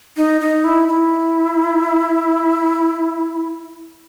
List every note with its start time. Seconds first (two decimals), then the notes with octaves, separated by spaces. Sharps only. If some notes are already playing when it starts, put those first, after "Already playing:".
0.17 D#4
0.41 D#4
0.64 E4
0.88 E4